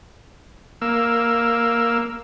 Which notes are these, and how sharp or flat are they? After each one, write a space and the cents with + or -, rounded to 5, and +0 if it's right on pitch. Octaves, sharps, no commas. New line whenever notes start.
A#3 +0 E6 +5